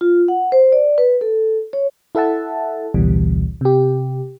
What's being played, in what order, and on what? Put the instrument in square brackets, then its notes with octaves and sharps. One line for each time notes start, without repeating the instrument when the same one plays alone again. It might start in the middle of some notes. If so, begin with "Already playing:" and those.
[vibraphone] F4
F#5
C5
D5
B4
A4
C#5
[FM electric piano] E4 A4 E5 F#5 A5
A1 D2 B2 E3 G3
C3 G4